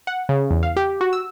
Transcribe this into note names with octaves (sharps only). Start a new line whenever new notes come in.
F#5
C#3
E2
F5
G4
F#4
E6